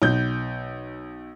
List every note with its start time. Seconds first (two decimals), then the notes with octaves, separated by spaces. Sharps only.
0.02 B1 G6